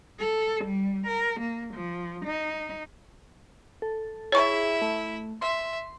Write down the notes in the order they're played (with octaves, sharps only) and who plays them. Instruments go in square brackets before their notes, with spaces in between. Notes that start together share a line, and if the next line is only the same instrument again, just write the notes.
[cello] A4
G3
A#4
A#3
F3
D#4
[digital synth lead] A4
[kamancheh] E4 E5 [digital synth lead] G#4 [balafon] C#5 C#6
[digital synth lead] A3
[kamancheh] E5 [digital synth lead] C6